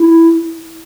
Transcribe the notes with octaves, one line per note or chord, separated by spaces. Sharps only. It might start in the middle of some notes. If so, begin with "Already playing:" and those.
Already playing: E4